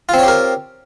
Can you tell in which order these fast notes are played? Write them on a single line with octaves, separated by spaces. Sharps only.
F4 C4 C#5 G4 A#4